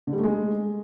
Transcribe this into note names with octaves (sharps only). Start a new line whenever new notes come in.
D3
G3
A3
G#3